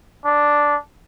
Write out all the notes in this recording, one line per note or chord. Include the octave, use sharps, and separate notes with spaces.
D4